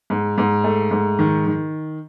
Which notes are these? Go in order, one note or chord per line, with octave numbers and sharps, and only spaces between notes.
G#2
G#2
A3
G#2
D#3
D#3